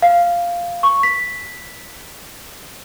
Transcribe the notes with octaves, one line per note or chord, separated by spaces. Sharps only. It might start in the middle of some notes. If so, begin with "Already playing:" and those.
F5
C#6
B6